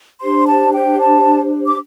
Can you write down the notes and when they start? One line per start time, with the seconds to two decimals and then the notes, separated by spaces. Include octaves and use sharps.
0.20 D4 G4 C5 C6
0.47 A5
0.73 G5
0.99 A5
1.66 D6